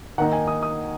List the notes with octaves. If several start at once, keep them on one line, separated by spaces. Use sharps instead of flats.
D#3 A#3 D#4 F#5
G#5
D#6
D#6